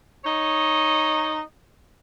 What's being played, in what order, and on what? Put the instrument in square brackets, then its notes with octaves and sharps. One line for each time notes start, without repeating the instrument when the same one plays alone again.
[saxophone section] D#4 C#5 D#5